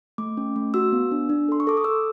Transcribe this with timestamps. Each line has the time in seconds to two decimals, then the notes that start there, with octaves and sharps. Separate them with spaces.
0.18 A3 D6
0.37 C#4
0.56 A3
0.74 F#4 E6
0.92 B3
1.12 D4
1.29 D4
1.48 A4 C6
1.60 C#6
1.67 A4 D6
1.77 D#6
1.84 A4 E6